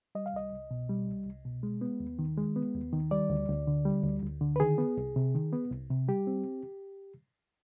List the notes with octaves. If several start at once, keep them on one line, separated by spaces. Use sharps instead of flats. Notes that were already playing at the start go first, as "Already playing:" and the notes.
G3 D#5
F5
C2 D#5
C2
B2
G3
C2
C2
B2
G#3
B3
D#2
D#3
G#3
B3
D#2
D#3
G3 D5
D2
D2
D3
G3
D2
D2
D3
B4
D#3 G#4
B3
C2
C3
D#3
B3
C2
C3
G3 G4
C4